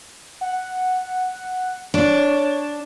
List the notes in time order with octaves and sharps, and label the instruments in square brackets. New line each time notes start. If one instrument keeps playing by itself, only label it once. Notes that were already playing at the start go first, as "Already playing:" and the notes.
[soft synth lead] F#5
[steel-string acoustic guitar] D4 [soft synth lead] C#5